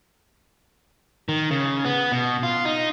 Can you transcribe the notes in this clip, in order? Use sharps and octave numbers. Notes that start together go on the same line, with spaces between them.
D#3
C#3
B3
B2
F4
D#4